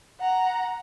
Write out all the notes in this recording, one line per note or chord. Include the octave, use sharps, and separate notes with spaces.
F#5 A#5